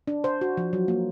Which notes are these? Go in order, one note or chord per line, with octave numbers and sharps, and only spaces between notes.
D4
C5
F#4
F3
F#3
A#3